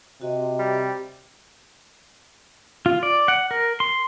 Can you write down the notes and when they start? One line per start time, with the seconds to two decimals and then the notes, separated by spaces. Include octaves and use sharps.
0.21 C3 F#4 D#5
0.59 G3
2.86 F4
3.03 D5
3.28 F#5
3.51 A#4
3.80 C6